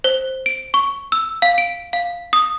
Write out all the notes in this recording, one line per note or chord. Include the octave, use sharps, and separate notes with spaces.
C5
D7
C#6
E6
F5
D7
F5
D#6